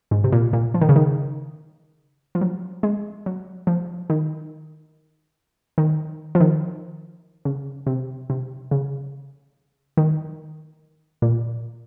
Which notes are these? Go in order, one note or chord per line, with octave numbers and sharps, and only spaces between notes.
G#2
C3
A#2
A#2
F3
D#3
C#3
D#3
F3
F#3
G#3
F#3
F3
D#3
D#3
F3
D#3
C#3
C3
C3
C#3
D#3
A#2